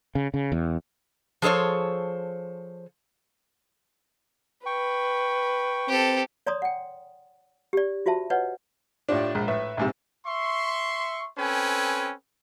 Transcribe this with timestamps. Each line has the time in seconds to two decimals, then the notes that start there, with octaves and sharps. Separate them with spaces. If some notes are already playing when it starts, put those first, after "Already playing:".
0.15 C#3
0.34 C#3
0.52 E2
1.42 F3 G#4 A4 C5 C#5
4.66 B4 G5 C#6
5.88 C4 G4 A4
6.47 C#5 D5 A#5 C6 D#6
6.62 F#5 G5
7.73 G4 D5
8.06 F4 F#4 C5 E5 A5
8.30 B4 C#5 D#5 F#5
9.08 A2 D4 F4 G4 D5
9.35 A#1 G#3
9.48 A2 B4 E5
9.77 A#1 G#2 C3
10.26 E5 C6 C#6
11.38 C4 C#4 A4 B4 G5 G#5